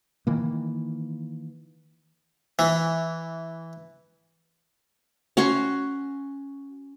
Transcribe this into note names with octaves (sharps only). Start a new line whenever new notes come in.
D#3 E3 A#3
E3
C#4 F#4 C6 C#6